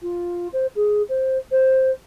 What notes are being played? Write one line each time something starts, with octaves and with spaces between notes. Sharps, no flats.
F4
C5
G#4
C5
C5